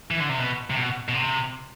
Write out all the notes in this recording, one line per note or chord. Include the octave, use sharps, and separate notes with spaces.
E3
D3
C3
B2
C3
B2
B2
C3